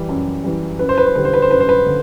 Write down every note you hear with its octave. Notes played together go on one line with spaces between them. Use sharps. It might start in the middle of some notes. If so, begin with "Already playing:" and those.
Already playing: E3 G3
F#2
E3 G3
F#2 B4
C5
B4
C5
D3 G3 B4
C5
B4
C5
F#2 B4
C5
B4
D3